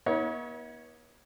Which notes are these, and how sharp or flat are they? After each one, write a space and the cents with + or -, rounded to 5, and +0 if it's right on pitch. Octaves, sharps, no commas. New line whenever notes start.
B3 -40 D#4 +45 C#5 +0